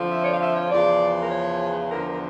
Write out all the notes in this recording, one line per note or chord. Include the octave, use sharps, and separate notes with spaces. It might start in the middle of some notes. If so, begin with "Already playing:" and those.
Already playing: F2 D3 F3
E5
C#5
D5
F5
E5
C#5
E2 C#3 F3 D5
A#4
C#5
E2 D3 F3 A#4
A#4